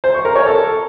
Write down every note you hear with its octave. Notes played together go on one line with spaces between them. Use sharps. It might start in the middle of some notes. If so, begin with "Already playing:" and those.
C5
C#6
A#4
C#5
A4